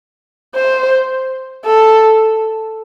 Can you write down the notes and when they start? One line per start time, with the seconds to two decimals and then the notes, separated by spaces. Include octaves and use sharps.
0.55 C5
1.66 A4